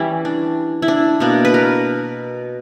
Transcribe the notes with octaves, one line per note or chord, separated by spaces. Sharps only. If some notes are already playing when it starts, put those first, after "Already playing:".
Already playing: E3 G3 C#4 E4
D4
E4
D4
B2 A#3 D4
B4
A#4